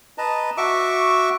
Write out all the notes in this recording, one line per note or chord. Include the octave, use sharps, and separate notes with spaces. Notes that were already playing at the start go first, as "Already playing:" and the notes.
B4 D#5 A5 A#5
F#4 E5 C#6 D6